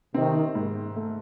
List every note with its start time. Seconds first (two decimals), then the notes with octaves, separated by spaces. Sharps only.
0.14 C3 D#3 C4
0.55 G#2
0.96 A3